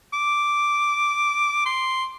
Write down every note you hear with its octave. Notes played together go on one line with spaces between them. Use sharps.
D6
C6